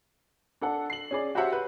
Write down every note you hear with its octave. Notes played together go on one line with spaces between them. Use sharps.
D4 A4 F#5
C7 F#7
C#4 G#4 D5
F#4 G4 C5 C#5 E5 F#5
B4